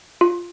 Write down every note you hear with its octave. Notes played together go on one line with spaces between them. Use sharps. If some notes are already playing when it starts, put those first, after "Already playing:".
F4